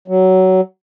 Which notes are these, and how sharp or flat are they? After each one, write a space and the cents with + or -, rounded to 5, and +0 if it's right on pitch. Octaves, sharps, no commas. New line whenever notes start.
F#3 +15